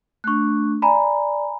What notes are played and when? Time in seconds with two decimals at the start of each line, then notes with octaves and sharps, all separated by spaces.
0.24 A3 D4 C#6 F#6
0.82 D5 G#5 A#5 B5